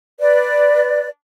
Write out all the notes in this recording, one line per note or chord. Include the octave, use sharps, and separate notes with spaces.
B4 D5